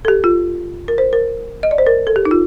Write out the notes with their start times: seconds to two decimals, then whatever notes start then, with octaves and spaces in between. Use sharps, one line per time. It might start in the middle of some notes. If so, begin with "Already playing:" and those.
0.05 A4
0.08 G4
0.24 F4
0.88 A#4
0.98 C5
1.13 A#4
1.63 D#5
1.71 D5
1.78 C5
1.86 A#4
2.07 A4
2.16 G4
2.25 D#4
2.31 F4